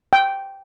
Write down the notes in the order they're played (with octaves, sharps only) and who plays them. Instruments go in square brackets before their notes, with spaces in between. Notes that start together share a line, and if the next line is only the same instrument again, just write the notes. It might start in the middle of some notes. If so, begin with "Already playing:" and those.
[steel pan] G5